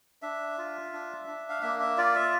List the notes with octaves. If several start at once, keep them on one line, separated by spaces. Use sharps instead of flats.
D4 E5
F4
D4
D4
F5
A#3 E5
E5
F4 D5
E5